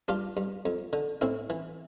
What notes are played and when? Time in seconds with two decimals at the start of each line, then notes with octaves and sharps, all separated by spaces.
0.08 G2 D4 F4
0.37 G2
0.65 F2
0.93 D3
1.21 A2 C4 E4
1.50 E3